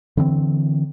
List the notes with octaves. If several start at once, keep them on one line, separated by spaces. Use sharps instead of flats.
D3 E3 A3 C4